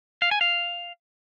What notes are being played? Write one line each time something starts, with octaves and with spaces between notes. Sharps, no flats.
F5
G#5
F5